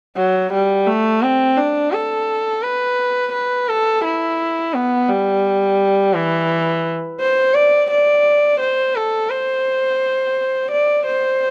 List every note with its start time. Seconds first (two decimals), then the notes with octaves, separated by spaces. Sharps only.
0.17 F#3
0.53 G3
0.87 A3
1.23 C4
1.57 D4
1.92 A4
2.63 B4
3.33 B4
3.69 A4
4.04 E4
4.74 B3
5.09 G3
6.14 E3
7.20 C5
7.54 D5
7.91 D5
8.60 C5
8.96 A4
9.30 C5
10.71 D5
11.06 C5